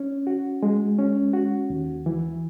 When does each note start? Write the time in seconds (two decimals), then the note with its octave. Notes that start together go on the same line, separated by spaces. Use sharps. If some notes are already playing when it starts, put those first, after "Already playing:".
Already playing: C#4
0.27 F#4
0.63 G#3
0.99 C#4
1.34 F#4
1.70 D#2
2.06 E3